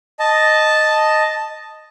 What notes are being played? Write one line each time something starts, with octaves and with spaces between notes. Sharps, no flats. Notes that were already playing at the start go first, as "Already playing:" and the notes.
D#5 A5